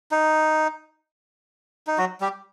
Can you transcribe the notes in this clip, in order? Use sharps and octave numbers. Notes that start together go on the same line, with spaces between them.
D#4
D#4
F#3 F#4
G3 G4